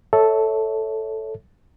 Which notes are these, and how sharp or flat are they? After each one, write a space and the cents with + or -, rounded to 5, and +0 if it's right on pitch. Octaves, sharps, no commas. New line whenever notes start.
A4 +0 C#5 +10 E5 -20